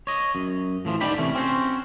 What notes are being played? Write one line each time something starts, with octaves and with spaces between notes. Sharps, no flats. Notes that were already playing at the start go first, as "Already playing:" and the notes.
C#5 D#5
F#2
A2 E3 F3
D#2 D3 D#4 D5 G5 B5
C3 E3 A3 C#4
C4 C#4 F#4 C5